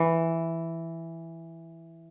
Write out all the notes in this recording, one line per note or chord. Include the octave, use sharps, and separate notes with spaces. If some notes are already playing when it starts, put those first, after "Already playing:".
Already playing: E3